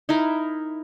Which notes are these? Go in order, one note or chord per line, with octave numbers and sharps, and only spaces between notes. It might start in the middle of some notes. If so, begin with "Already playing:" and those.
D#4 E4 A#4